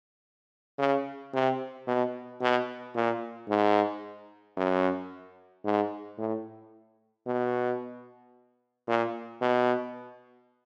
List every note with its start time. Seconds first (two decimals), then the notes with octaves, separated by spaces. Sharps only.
0.79 C#3
1.33 C3
1.87 B2
2.41 B2
2.95 A#2
3.49 G#2
4.57 F#2
5.65 G#2
6.18 A2
7.26 B2
8.88 A#2
9.41 B2